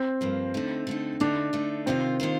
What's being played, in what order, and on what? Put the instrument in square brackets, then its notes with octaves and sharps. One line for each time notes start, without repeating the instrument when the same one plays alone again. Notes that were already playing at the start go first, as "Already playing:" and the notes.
Already playing: [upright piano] C4
[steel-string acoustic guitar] G2 F3 A#3
D3 A3 D#4
D3 A3 D#4
[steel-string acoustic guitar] D3 A3 D#4 [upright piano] D4
[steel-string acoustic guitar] D3 A3 D#4
[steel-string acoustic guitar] C3 D#3 A#3 F4 C5 [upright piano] C4
[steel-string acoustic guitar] C3 D#3 A#3 F4 C5